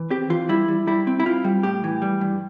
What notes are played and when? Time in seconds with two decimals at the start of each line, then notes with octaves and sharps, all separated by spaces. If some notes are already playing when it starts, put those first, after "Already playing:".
Already playing: E3
0.10 C4 G4
0.30 E3 F4
0.49 G3 E4
0.68 G3
0.87 G3 E4
1.07 C4
1.20 E4
1.25 C4 F4
1.44 G3
1.63 A2 G4
1.84 E3
2.02 G3
2.21 G2